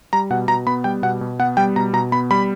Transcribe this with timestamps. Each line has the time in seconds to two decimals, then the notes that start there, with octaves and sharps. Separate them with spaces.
0.13 G3 A#5
0.30 B2 F#5
0.48 B2 A#5
0.66 B3 B5
0.84 G3 G5
1.03 B2 F#5
1.21 B2
1.39 B3 F#5
1.57 G3 G5
1.76 B2 A#5
1.93 B2 A#5
2.12 B3 B5
2.31 G3 B5